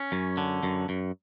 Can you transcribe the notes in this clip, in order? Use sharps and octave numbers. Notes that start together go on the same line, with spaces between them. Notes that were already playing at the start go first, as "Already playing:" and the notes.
Already playing: C#4
F#2
D3
F#2
F#2